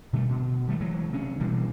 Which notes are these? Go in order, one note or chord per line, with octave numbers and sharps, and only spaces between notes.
B2 D3 G3 A3
B2
D#3 G3 A3
E3 F#3 G#3 A3
C3 C#4 D4
B2 E3 G3 A#3